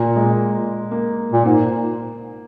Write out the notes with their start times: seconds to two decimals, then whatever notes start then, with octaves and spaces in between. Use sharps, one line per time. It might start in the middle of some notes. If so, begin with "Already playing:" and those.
Already playing: A#2 A#3
0.16 G#3
0.25 A#3
0.91 A#3
1.33 A#2
1.45 G#2 A#3